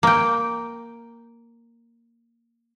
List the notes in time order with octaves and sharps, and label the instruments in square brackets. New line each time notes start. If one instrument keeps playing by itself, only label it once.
[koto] A#3 G5